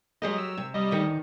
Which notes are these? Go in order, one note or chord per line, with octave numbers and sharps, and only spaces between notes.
F#3 G#3 G4 A#4 D#5
E6
C3
G3 D#5
D2 D#3